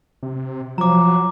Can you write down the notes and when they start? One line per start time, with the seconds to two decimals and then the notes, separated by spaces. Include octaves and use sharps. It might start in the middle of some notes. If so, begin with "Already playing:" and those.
0.23 C3
0.78 F3 F#3 A#5 D6